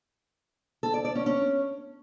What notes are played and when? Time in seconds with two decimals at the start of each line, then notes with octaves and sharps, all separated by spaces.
0.83 A4
0.94 D5
1.05 D5
1.15 C#4
1.26 C#4